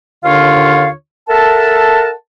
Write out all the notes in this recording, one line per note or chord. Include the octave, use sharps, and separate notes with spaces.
D#2 D3 D4 F4 C#5 F5
A4 A#4 E5 F#5 A5